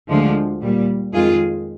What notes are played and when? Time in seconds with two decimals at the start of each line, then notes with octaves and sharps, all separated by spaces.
0.08 D2 D3 F3 G#3
0.61 A#2 G3
1.13 F2 D#3 G#3 F4 G#4